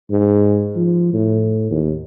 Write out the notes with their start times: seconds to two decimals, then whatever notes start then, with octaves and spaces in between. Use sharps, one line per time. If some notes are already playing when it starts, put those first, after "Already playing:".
0.11 G#2
0.76 F3
1.13 A2
1.71 D#2